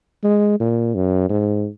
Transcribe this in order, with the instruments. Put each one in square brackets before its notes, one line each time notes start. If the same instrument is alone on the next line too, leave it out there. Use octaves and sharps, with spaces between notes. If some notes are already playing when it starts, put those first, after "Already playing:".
[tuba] G#3
A#2
F#2
G#2